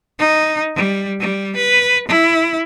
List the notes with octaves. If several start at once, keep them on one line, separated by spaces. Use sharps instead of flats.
D#4
G3
G3
B4
E4